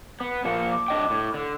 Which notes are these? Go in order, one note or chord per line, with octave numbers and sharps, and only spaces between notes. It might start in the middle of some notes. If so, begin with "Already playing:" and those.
B3
A#2 F3 A#3 C#7
D6
D4 D#5 G5
A2
D3